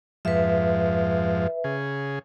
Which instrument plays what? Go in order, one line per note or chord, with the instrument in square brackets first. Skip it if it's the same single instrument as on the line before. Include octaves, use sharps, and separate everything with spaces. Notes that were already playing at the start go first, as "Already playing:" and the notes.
[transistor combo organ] F2 G#2 F3 [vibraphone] B4 E5
[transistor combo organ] C#3 G#4